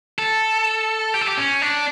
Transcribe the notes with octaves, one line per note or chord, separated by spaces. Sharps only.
A4
G4
A4
G4
C#4
D4